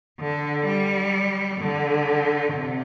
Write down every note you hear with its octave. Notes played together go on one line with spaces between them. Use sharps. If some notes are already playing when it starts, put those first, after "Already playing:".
D3
G3
D3
C3